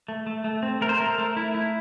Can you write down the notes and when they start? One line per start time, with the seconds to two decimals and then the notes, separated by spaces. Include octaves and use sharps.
0.08 A3
0.27 A3
0.44 A3
0.63 C4
0.81 A3 A#4
0.89 C5
0.98 A3 A#4
1.18 A3
1.37 E4
1.55 E4